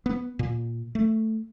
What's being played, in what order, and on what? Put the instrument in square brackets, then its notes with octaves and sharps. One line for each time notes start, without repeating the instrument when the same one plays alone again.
[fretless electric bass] B3
A#2
A3